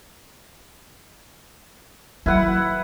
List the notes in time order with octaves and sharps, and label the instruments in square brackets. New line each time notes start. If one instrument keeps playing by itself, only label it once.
[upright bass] F#3 [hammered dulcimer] E4 B4 F#5